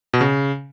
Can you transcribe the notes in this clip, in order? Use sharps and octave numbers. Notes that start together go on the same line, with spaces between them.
B2
C#3